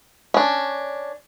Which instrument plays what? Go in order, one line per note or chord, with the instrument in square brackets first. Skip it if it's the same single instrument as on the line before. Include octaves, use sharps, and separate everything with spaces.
[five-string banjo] C#4 D4